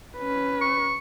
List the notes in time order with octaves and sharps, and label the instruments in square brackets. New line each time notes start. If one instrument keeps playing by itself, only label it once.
[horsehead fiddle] C#4 B4
[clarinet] C#6